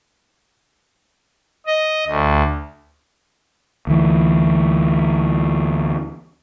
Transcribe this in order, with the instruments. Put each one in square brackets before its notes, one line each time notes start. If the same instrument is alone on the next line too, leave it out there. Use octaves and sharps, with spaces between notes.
[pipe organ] D#5
D2
[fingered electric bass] D2 E3